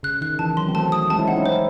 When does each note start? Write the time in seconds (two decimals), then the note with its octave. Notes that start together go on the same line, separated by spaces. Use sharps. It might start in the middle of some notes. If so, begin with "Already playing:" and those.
0.03 C#3 F#6
0.21 D#3 F#6
0.39 E3 A5
0.56 F#3 C6
0.68 C4
0.75 A3 A5
0.92 D#6
1.10 G#3 C4 A5
1.19 C#4 E4
1.27 C4 D#4 F#5
1.36 C#4 E4
1.46 C5